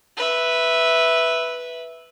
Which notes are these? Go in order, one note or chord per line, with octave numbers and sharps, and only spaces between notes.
B4 E5